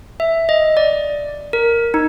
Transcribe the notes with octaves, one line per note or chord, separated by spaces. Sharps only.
E5
D#5
D5
A#4
D#4